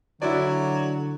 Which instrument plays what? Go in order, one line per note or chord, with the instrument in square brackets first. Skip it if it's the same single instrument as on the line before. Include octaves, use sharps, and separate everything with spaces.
[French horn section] D3 [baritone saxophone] F#3 [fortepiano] E4 F#4 D5